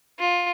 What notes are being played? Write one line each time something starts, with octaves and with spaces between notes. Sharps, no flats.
F4